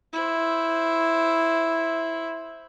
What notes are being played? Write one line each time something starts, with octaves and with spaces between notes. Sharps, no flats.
E4 C5